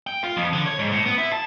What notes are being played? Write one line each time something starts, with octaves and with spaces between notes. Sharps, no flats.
G5
F4
F2
D3
C#5
G#2
A2
B3
E4
A5